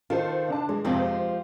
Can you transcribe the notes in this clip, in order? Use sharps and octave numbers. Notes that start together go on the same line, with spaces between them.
D#3 F4 A4 C5
D3 D4 A5
E3 G#3
F2 C3 F3 G#3 C4 G4
C5